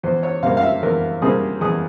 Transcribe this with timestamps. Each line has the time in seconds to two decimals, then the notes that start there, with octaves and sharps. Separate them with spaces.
0.03 E2 C5
0.23 C#5
0.43 C3 G3 A#3 F5
0.57 F5
0.63 E5
0.83 E2 A#4
1.22 C3 G3 A#3 G#4
1.61 E2 G#4